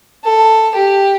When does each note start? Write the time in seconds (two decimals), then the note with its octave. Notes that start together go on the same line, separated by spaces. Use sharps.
0.25 A4
0.75 G4